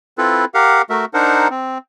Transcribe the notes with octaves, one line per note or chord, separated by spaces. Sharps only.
C4 E4 F4 A4 B4
G4 A#4 F5 F#5
A3 F#4 A#4 E5
D4 D#4 A#4 C5 F#5
C4